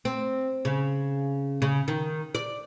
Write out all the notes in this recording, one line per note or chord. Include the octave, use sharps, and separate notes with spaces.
C4
C#3
C#3
D#3
D5